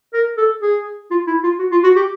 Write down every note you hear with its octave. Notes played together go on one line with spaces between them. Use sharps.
A#4
A4
G#4
F4
E4
F4
F#4
F4
F#4
G4